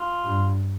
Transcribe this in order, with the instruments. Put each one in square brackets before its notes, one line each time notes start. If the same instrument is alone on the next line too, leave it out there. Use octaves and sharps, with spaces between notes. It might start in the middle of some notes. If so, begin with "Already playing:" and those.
Already playing: [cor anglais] F4
[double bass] G2